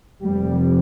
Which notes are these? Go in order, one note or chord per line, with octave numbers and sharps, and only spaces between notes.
F1 F2 C3 G3